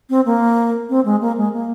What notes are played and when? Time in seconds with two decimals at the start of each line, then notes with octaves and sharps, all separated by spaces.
0.10 C4
0.26 A#3
0.90 C4
1.05 G#3
1.21 A#3
1.37 G#3
1.53 A#3